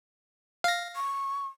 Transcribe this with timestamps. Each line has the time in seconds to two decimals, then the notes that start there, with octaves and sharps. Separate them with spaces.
0.64 F5 A#6
0.96 C#6